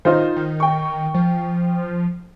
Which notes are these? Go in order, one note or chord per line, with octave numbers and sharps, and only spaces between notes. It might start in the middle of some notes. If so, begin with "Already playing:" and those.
D#3 D#4 F4 C5
D#3
G5 C#6
F3